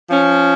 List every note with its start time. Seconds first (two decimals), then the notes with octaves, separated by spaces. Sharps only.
0.10 F3 C#4